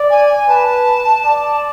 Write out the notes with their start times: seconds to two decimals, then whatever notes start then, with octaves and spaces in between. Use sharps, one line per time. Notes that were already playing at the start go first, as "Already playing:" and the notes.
Already playing: D5
0.10 G#5
0.48 B4 A5
1.25 D5